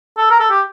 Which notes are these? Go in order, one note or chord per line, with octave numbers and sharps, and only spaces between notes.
A4
A#4
A4
G4